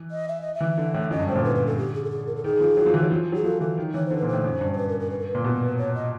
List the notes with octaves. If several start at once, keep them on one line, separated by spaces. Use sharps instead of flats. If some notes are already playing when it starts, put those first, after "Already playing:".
Already playing: E3
D#5
E5
D#5
E5
E3
D3
A2
F#2 D#5
G2
A2 C5
A#2
D3 B4
B4
A4
G4
G#4
A4
G#4
A#4
A4
D#3 G#4
F3
F#3
F3
E3
F#3
F3
F#3 G#4
F3 A4
E3 A4
D#3
E3 C#5
D3 C5
B4
A#2
C5
A2
F#2
G2
C5
B4
A#4
A#4
B4
A#4
B4
A#2
B2
C#5
D#5